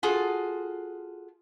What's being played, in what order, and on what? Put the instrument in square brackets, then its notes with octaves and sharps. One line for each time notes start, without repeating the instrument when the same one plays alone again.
[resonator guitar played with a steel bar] F4 F#4 G#4 A4